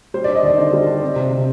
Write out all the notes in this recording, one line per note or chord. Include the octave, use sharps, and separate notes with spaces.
G3 C5
D5
D4
D#5
D#2 D5
D3 C5
G3
D4
C4
C3
C3